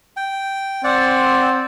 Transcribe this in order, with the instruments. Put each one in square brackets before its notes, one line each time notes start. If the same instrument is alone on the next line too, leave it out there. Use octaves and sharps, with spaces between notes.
[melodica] G5
[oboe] C4 [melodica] D5 F#5